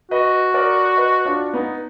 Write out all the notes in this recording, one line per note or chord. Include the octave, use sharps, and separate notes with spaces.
F#4 B4 D#5
A#4 D5
B4 D#5
D4 F4
B3 D#4